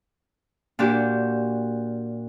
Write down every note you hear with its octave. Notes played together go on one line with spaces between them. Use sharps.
A#2 D4 F#4 G4